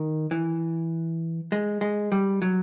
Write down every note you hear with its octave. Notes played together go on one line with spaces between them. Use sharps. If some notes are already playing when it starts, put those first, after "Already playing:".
Already playing: D#3
E3
G#3
G#3
G3
F#3